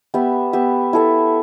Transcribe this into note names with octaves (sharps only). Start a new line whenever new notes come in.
B3 G4 E5
B3 G4 E5
E4 A4 E5